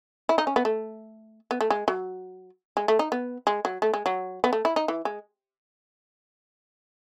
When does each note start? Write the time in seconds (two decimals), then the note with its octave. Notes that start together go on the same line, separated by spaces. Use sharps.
0.29 E4
0.38 D#4
0.47 C#4
0.56 B3
0.65 A3
1.51 B3
1.61 A3
1.70 G#3
1.88 F#3
2.77 G#3
2.88 A3
2.99 D#4
3.12 B3
3.47 G#3
3.65 F#3
3.82 A3
3.94 G#3
4.06 F#3
4.44 B3
4.53 A3
4.65 E4
4.76 D#4
4.88 E3
5.05 G#3